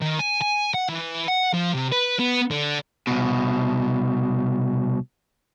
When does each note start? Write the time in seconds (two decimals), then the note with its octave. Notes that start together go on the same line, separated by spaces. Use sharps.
0.02 D#3
0.20 G#5
0.42 G#5
0.74 F#5
0.89 E3
1.28 F#5
1.54 F3
1.74 C3
1.92 B4
2.20 B3
2.51 D3
3.07 C2 B2